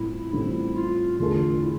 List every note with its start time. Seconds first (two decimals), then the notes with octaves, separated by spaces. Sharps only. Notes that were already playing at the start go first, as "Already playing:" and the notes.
Already playing: A1 A2 G3 C4 E4 F4
0.33 A1 A2 G3 C4 E4 F4
0.76 F4
1.18 E2 D3 A3 D4 F4 A4
1.62 E4